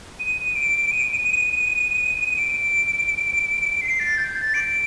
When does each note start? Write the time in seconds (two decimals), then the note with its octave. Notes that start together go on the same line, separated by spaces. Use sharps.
0.20 D#7
0.55 D7
0.91 D#7
2.37 D7
3.81 C7
3.99 A6
4.18 G6
4.36 A6
4.54 D7